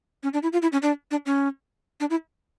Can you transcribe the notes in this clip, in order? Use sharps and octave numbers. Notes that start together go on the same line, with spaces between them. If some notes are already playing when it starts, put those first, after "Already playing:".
C#4
D4
E4
F4
E4
C#4
D4
D4
C#4
D4
E4